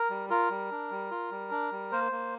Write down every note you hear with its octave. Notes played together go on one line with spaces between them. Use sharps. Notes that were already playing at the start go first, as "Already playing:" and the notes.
Already playing: A#4
G3
F4 A#4
G3
D4
G3
F4
G3
D4
G3
A#3 C5
A#3